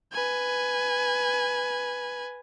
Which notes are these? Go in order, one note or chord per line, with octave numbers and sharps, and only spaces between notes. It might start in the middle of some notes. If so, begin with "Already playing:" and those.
B4 G#5